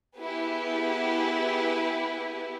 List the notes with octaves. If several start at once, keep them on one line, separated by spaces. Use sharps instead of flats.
B3 E4 G4 G#4 B4